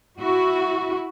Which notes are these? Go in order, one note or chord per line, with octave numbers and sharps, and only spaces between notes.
E4 F#4